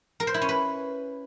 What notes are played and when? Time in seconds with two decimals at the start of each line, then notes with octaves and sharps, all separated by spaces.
0.20 A#4
0.27 C5
0.34 E4
0.41 C#4
0.49 B4